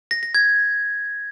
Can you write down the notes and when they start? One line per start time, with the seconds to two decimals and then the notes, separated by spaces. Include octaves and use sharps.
0.11 A#6
0.23 A#6
0.35 G#6